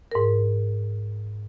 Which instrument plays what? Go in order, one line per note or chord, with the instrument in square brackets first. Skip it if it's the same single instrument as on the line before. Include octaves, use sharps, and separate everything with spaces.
[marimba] G#2 A#4